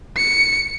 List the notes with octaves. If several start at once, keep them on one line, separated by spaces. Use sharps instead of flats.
C#7